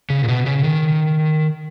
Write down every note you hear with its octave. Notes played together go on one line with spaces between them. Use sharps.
C#3
A#2
B2
C#3
D#3